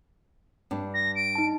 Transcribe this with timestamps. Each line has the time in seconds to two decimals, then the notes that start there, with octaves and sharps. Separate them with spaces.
0.71 G2 D4
0.94 A#6
1.15 D7
1.35 D#4 A5